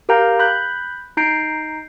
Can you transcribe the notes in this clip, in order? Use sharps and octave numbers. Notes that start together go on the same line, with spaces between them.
G4 A#4 F5 G5 A#5 G6
B5 F#6 G6
D#4 A#5 G6 C7 D7